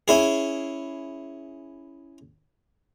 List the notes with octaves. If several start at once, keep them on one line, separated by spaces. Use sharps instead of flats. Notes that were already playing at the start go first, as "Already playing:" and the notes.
C#4 E4 G#4